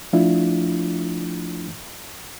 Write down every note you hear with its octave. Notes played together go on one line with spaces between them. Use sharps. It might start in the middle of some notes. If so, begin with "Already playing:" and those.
F3 A3 D4 E4 F4